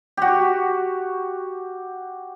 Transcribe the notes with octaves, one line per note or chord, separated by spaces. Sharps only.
F#4 G4